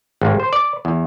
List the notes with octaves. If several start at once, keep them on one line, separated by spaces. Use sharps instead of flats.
G#1
C5
D5
E2